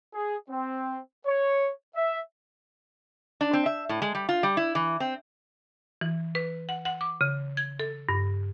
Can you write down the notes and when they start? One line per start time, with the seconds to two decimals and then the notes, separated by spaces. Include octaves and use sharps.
0.14 G#4
0.50 C4
1.26 C#5
1.96 E5
3.41 D4
3.53 C4
3.66 E5
3.89 A2
4.02 G#3
4.15 G3
4.29 F4
4.43 G3
4.57 E4
4.75 E3
5.00 C4
6.01 E3
6.35 B4
6.69 F#5
6.85 F#5
7.01 D6
7.21 C#3
7.57 G#6
7.80 A4
8.09 G2